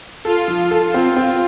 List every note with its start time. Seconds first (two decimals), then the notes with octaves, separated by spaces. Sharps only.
0.25 F4 A4
0.48 F3
0.71 A4
0.94 C4
1.17 C4